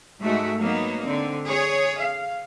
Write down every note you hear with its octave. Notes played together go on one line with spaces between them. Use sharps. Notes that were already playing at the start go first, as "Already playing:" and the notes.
G#2 G#3 A3 F#4 E5
F#3 A#3 B3 D#4
D3 C4
G#4 C#5
F5